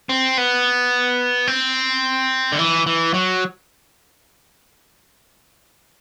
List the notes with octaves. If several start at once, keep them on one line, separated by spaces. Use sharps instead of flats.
C4
B3
C4
D3
E3
E3
F#3